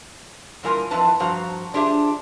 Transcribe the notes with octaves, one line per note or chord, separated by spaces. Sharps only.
A#2 E3 G3 F4 A#4 G#5
F2 E3 F4 B4 A5
G2 F3 F#4 C5 F5 A#5
D4 F4 G4 G#4 C5 E5